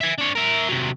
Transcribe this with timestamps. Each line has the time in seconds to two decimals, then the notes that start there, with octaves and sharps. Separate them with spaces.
0.01 E5 G#5
0.18 D4 C#5
0.35 A#4 E5
0.69 C3 F#3